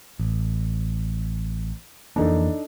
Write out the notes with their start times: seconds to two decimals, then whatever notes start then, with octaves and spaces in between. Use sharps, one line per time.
0.20 A1
2.16 F2 E3 A#3 D4 D#4 A4